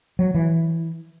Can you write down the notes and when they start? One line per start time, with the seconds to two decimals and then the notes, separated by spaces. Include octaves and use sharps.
0.19 F#3
0.34 E3